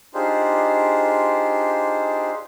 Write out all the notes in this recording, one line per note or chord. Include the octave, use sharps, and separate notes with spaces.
D4 D#4 F4 G4 G#4 C5